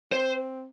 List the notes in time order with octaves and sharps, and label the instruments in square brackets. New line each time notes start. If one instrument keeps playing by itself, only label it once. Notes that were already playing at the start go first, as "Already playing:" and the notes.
[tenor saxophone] C4 [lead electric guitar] C5